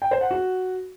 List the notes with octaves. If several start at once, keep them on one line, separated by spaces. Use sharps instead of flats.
G5
C5
F#5
F#4